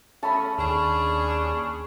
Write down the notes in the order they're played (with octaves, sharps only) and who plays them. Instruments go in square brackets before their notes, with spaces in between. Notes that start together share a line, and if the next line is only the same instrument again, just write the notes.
[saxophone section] C#3 A3 C#4 [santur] A5 B5 D#6
[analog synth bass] D#2 [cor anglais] C#4 [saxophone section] D4 G#4